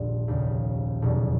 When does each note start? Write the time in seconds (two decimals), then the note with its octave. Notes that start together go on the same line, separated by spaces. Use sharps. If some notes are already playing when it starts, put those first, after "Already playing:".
Already playing: F1 A#1 D#2 D3 G3
0.28 F1 D#2 C#3
1.02 F1 E2 B2 F#3